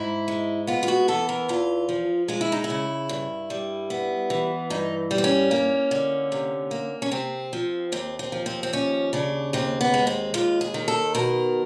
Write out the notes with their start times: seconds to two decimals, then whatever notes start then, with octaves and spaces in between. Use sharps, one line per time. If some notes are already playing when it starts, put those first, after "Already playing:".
Already playing: G#2 E4
0.28 G#3
0.67 B3 F4
0.83 F4
0.88 F#4
1.08 E3 A4
1.29 A#4
1.48 E2 F4
1.89 F3
2.28 G#3 F4
2.41 E4
2.52 D#4
2.64 E4
2.70 C#3
3.09 G2
3.50 G3
3.90 B3
4.30 E3
4.70 G2 D#4
5.11 G3
5.18 C4
5.24 C#4
5.51 A#3
5.91 D3
6.32 C3
6.71 A#3
7.02 C#4
7.12 C3 C4
7.53 F3
7.92 D#2 C4
8.19 C4
8.32 F3
8.46 C4
8.63 C4
8.73 D#2 C#4
9.13 C#3 D4
9.53 D#2 C4
9.81 B3
9.94 G#3
10.07 C4
10.34 D#2 F4
10.61 G#4
10.74 D#3
10.88 A4
11.15 B2 A#4